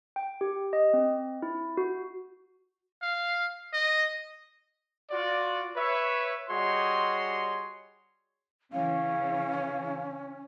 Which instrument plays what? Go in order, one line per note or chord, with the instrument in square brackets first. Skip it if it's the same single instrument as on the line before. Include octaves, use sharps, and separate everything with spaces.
[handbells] G5
G4
D#5
C4
E4
F#4
[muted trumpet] F5
D#5
[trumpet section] F4 F#4 D5
B4 C#5 E5
G3 F#4 G#4 C#5 D#5 C6
[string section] C#3 E3 [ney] C#4 [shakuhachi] F5